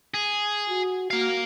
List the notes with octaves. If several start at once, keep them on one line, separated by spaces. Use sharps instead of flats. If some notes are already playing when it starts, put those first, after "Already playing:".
G#4
F#4
A#3 F#4 F5